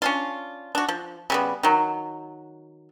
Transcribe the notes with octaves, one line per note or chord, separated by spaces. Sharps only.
C#4 D4 F4
D4 F#4
F3
C#3 G3 B3
D#3 F#3